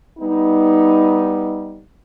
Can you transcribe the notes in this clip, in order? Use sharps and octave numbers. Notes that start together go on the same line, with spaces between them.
G3 B3 D#4